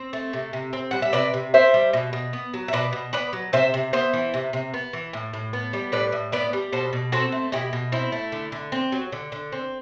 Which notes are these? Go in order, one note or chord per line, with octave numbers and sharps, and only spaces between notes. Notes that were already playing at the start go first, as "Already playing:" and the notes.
Already playing: C4
A3
C3
C3
C4
G3 F#5
E5
C3 B4 D5
C3
C4 C5 E5
G3
B2
B2
B3
F#3
E5
B2 B4 D5
B2
B3 B4 D5
F#3
C3 C5 E5
C3
B3 C5 E5
E3
C3
C3
B3
E3
A2
A2
B3
G3
A2 B4 D5
A2
B3 B4 D5
G3
B2 A4 C5
B2
C4 F#4 A4
A3
B2 E4 G4
B2
C4 E4
A3
D3
D3
C4
F#3
D3
D3
C4